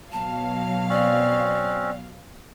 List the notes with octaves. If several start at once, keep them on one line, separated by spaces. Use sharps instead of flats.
B2 F#3 F5 A5
C4 C#4 F#4 D5